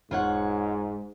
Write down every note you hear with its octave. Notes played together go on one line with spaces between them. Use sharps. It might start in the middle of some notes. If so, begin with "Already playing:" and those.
E1 G#2 F4 C#5 F#5